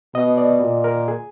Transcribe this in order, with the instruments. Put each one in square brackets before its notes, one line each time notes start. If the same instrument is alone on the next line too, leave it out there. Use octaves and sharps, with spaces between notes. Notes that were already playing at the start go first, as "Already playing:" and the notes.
[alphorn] B2 [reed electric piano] D#5
[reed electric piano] D5
[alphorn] A#2
[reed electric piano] A#4
G#4